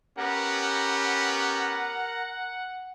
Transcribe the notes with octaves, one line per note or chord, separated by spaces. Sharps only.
B3 C#4 G4 A#4 F#5 A#5